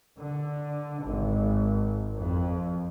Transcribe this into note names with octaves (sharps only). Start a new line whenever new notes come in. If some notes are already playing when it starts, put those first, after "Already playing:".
D3
G#1
F2